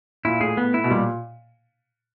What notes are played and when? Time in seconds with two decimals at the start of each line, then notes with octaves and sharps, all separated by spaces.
0.25 A#2 E4
0.40 A2 G#4
0.57 B3
0.74 E4
0.84 B2
0.90 A#2 G3